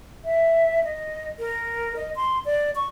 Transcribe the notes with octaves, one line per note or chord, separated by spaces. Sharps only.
E5
D#5
A#4
D#5
C6
D5
C#6